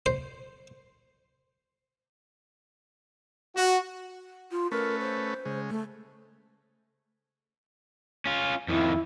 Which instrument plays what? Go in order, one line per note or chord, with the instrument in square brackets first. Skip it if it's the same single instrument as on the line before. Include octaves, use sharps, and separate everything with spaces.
[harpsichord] C5
[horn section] F#4
[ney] F4
[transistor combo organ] A3 C#4 B4 [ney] A#4
[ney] C5
[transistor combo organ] C#3 G#3
[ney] A3
[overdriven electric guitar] C#4 F4
[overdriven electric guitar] F2 D#3 [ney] E4